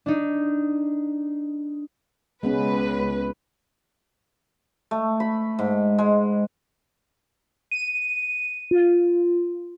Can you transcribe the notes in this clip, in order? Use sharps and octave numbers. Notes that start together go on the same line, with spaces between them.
D4 D#4
C#2 G#3 B3 C#4 B4
A3
B5
G#2
G#3
D#7
F4